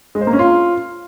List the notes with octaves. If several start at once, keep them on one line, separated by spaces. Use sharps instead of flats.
G#3
C5
A#3
C#4
F4